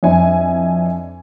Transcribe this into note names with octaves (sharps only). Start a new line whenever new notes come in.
F2 D4 E4 G#5